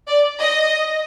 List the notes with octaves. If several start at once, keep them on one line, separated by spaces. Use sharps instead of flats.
D5
D#5